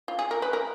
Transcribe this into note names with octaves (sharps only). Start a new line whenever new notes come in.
F4
G#4
A#4
B4
A#4